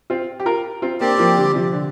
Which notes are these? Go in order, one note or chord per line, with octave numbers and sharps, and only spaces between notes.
C4 F4
G4
F4 A#4
C4 F4
A#3 C4 D4 G4 D5
F3 A#3
D3 G3
C3 F3
D3